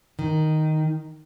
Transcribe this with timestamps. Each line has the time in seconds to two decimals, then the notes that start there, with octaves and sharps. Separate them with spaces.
0.19 D#3